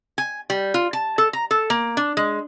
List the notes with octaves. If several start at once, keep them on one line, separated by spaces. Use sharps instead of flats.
G#5
G3
F4
A5
A4
A#5
A4
A#3
D4
G#3